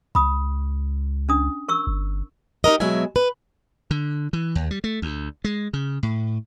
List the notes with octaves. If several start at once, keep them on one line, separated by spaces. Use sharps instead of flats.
C#2 B5 D#6
C#4 D4 D#6
A#4 C#6 E6
G1
D#4 G4 A#4 D#5
B2 F#3 G#3 E5 G#5
B4
D3
E3
D#2
G3
A3
D2
G#3
C#3
A2